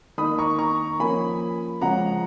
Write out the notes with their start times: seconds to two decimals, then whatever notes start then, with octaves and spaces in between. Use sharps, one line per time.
0.18 D#3 A#3 D#4 B5 D#6
0.38 A#5 C#6
0.58 A#5 C#6
0.99 F3 A#3 C#4 G#5 B5
1.81 C#3 F3 G#3 C#4 F#5 A#5